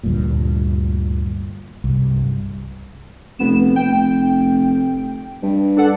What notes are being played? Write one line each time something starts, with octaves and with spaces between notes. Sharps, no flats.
D2 G2 A#2
C2 G2
F1 B3 E7
F1 G5
G2
D4 A4 F#5